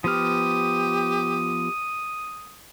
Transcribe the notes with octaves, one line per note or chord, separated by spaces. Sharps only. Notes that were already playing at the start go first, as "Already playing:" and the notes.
F3 B3 G4 D#6 F6